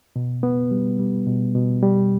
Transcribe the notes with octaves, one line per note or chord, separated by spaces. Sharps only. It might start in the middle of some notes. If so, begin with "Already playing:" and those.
B2
B3
G3
G3
B2
B2
G3